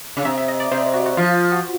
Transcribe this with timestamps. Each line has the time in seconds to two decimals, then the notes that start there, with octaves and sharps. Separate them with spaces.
0.17 C#3
0.25 C3 E5
0.37 E5
0.48 D#5
0.60 D5
0.71 C3 C5
0.94 F#4
1.06 F#4
1.17 F3 F4
1.52 F#4